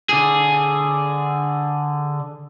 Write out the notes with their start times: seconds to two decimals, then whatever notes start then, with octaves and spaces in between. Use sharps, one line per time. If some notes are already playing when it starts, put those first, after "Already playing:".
0.09 D3 G#4